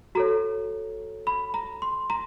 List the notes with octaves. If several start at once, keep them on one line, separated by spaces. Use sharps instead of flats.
F#4 A4 C#5 A#5
B5
A#5
C6
A#5